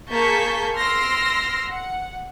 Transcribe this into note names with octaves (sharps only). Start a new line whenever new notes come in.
A#3 G#4 A5 C#6 G6 B6
C6 E6 F6 A#6 D7
F#5